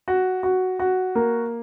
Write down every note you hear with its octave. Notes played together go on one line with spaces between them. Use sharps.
F#4
F#4
F#4
A#3